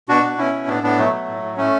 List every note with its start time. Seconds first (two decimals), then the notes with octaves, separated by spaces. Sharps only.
0.09 B2 D4 F#4
0.24 B2
0.38 B2 C#4 E4
0.53 B2
0.68 A2 B3 D4
0.83 A2 B3 D4
0.98 B2 F#3 A3
1.13 B2
1.28 A2
1.43 A2
1.57 A2 A3 C#4